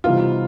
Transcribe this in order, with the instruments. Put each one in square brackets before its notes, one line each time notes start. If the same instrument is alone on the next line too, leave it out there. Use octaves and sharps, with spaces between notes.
[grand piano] C3 E3 G3 B3 D#4 [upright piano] F4